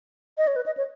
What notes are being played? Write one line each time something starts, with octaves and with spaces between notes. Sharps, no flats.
D#5
C#5
B4
D#5
C#5